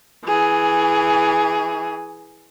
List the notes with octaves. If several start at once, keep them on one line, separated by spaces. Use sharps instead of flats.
E3 G#4